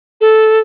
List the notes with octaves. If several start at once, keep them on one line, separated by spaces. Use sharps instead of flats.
A4